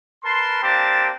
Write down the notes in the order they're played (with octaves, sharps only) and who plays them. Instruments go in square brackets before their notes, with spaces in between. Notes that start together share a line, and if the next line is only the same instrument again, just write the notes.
[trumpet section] A#4 B4 A5 C6
A#3 C4 D4 G4 A5